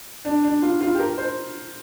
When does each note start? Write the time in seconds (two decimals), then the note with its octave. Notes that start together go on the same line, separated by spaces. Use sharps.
0.25 D4
0.44 D4
0.62 F4
0.81 F4
0.95 G4
0.99 A#4
1.18 C5